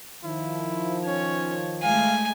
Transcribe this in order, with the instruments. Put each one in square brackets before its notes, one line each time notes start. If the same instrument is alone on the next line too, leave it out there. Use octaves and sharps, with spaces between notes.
[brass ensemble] D#3 F3 [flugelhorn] E4
[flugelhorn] C#4 [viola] C#5
[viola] G#3 A3 [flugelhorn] F5 [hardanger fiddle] G#5